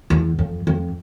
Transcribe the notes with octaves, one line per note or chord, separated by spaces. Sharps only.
E2
F2
F2